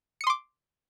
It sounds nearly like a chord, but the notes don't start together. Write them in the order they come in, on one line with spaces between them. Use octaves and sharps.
C#7 D#6 C6 D6